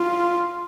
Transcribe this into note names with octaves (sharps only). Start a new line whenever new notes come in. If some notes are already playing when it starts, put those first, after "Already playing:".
Already playing: F4